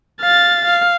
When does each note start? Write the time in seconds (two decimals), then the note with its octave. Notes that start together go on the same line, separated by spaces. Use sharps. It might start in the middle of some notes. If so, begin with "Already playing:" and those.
0.21 F5 A6
0.65 F5